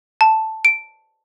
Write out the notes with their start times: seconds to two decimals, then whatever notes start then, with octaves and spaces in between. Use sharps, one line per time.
0.21 A5
0.65 D7